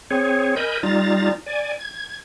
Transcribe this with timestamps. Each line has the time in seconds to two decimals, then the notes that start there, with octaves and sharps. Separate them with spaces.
0.11 C4 G#4 C#5
0.56 A#4 D#5 G#5 B5 G6
0.83 G3 D#4 F4 A#5 A6
1.46 D5 G#5
1.79 G#6